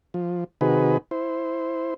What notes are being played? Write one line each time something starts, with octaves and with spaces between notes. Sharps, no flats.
F3
C3 D#3 D#4 F#4 G#4 B4
E4 C5